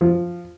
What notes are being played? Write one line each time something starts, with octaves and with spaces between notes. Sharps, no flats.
F3